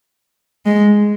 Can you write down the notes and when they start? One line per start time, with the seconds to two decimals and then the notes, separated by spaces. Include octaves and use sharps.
0.66 G#3